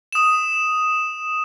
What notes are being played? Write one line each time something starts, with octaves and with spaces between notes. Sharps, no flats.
D#6 E7